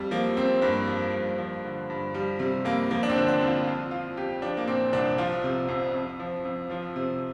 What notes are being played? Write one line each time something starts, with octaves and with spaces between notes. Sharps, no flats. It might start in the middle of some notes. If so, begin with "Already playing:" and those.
Already playing: F2 G3
F3 A#3
F2 C4
G2 A#3
F3
G2
F3
D3
G2
F3 G3
C3 G3
F2 A#3
F3 A#3
D4
C4
D3
D4
F2
F4
F2 F4
F3 F4
F2 G4
F3 D4
A#3
A#2 C4
C2 D4
F3 F4
C3
F2
F2
F3
F2
F3 F4
C3